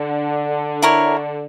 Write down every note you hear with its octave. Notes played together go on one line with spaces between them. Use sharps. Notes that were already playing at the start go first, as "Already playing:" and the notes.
Already playing: D3
E4 A#4 C#5